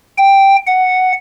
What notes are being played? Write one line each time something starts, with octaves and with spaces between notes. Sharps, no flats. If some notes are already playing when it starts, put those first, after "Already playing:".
G5
F#5